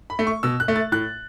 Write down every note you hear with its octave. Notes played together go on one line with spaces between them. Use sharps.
B5
A3
C#6
B2 E6
F#6
A3
A6
A2 F#6